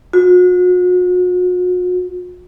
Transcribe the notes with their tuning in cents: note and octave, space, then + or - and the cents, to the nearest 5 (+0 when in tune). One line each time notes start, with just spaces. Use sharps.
F#4 -40